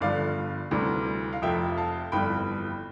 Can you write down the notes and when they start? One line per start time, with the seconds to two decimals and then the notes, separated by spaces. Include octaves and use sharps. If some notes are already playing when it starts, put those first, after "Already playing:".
0.01 G1 G2 D3 F3 D5 F5
0.71 D2 C3 E3 G3
1.33 F5
1.42 F1 F2 C3 F3 E5 G5
1.77 F5 A5
2.12 G1 F2 E3 G3 G5 B5